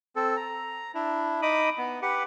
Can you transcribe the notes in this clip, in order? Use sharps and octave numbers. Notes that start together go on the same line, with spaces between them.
C4 A4
A#5
D4 E4
D#4 D#5 B5 D6 D#6
B3
G4 B4 F#5